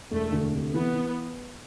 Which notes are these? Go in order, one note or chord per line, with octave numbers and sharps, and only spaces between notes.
E1 A3
D2
C3
E3 B3
E3